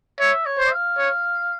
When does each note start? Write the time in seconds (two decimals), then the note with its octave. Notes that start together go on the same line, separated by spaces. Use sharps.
0.20 C#5 E5
0.46 C#5
0.58 C5
0.72 F5
0.98 C#5